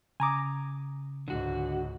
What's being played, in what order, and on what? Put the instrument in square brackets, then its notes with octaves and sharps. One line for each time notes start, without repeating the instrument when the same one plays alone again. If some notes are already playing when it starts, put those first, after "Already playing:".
[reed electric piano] C#3 D#6 [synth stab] G#5 A#5 D6
[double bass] C#2 G#2 [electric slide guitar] D3 F#4